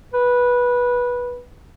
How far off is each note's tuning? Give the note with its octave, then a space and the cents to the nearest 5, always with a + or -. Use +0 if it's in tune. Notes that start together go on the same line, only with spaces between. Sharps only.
B4 -15